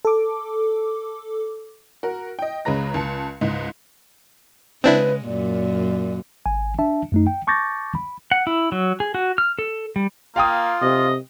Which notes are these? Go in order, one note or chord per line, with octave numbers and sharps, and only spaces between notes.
A4 D6
F#4 A#4
D#5 G5
C#2 C#3 G#3 B4 A#5 A#6
C#2 A5 C#7
C#2 G#2 D#5
C#3 G#3 C4 D4 E4 B4
F#2 A#2 D5
G#1 G#5
D4 E5 A5
F#2 A3 D#4
G5
A5 C#6 D6 G6 A6 A#6
B5
F#5
E4
F#3
G#4
F#4
F6
A4
G3
A#3 F4 F5 G5 D#6
C3 D#5